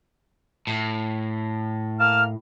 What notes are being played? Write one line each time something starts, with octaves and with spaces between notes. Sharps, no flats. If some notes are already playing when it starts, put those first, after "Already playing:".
A2
A#3 A5 F6